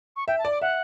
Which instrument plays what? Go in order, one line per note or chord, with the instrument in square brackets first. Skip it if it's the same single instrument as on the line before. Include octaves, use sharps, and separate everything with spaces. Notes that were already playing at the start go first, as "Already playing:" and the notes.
[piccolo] C#6
[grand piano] E5 [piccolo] G5
[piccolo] A5
[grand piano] D5
[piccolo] D6
[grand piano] E5 [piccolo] F#5